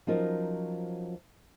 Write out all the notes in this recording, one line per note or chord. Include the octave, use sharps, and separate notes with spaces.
F3 F#3 C#4 D#4 F4 A#4